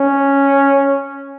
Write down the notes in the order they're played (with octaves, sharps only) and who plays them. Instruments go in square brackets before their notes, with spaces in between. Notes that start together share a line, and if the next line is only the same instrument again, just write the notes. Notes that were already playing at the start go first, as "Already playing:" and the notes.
Already playing: [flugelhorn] C#4